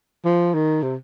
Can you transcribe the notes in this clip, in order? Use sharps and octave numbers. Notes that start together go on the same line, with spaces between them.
F3
D#3
C3